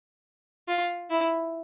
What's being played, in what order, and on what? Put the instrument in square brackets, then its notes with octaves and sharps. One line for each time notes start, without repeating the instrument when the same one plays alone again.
[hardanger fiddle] F4
E4